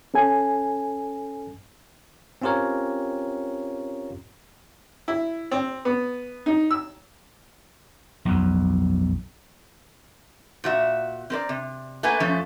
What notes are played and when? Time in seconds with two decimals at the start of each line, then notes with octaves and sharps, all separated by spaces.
0.14 C#4 A4 G#5
2.42 C4 C#4 F4 G4 A#4 C#5
5.08 E4
5.51 C4
5.85 B3
6.46 D#4
6.71 E6
8.25 B1 F2
10.64 A#2 F#4 E5
11.30 C4 A#4 D5
11.49 C3
12.03 A3 A#3 B4 F#5 G#5
12.20 F2 F3 A3 C#4 A4